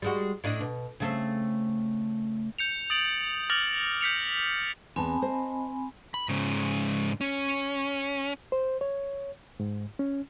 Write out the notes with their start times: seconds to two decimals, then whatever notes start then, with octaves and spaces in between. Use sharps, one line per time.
0.02 G3 G#3 F#4
0.44 A2 D4 D#5
0.61 B2
1.00 C#3 A3 C4
2.59 G6 C#7 F7
2.90 D#6 A6 D7 F#7
3.50 D6 F6 A6 A#6 F7 F#7
4.01 G6 B6 C#7 F7
4.96 E2 C4 G#5 A5 B5
5.22 C5 D#5
6.14 B5
6.29 G#2 C#3
7.21 C#4
8.52 C5
8.81 C#5
9.60 G#2
9.99 C#4